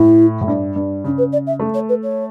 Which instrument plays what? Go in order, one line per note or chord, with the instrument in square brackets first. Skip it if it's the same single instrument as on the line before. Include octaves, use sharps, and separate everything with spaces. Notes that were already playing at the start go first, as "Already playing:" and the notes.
Already playing: [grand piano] A2 [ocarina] E4
[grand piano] A2
G2
G2
[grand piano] C#3 [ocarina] D4
[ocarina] B4
D5
E5
[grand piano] A3
[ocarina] C#5
B4
C#5